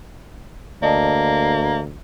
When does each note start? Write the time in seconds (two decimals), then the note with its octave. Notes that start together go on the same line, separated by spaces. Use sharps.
0.82 D2 A#3 D5 D#5 A5